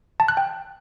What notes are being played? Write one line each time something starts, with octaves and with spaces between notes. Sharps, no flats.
A5
F#6
G5